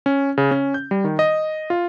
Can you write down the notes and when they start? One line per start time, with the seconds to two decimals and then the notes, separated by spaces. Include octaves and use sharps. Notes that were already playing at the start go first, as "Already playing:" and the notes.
0.06 C#4
0.38 C#3
0.51 C#4
0.74 G6
0.91 G3
1.04 D#3
1.19 D#5
1.70 F4